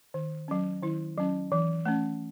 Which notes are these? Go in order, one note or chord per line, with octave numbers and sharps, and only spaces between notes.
D#3
F#3 C#4
D#3 E4
F#3 C#4
E3
A3 C#4